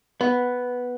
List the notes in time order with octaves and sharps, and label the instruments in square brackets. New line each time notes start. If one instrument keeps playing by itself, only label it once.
[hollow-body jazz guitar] B3